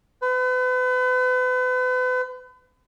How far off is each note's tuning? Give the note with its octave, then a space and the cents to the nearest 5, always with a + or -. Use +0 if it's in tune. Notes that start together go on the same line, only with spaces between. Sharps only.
B4 +40